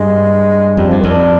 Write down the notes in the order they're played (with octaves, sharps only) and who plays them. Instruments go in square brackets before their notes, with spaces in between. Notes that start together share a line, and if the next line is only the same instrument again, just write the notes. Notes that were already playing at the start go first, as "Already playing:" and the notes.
Already playing: [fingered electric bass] G2 [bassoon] G#3
[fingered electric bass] F2 [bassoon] G3
[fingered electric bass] G2 [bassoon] F3
[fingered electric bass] F2 [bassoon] D#3
[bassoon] D4